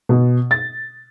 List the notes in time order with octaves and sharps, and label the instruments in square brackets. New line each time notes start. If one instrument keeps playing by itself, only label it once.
[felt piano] B2
A6